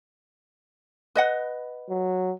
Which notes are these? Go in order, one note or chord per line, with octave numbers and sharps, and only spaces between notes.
B4 D#5 F#5
F#3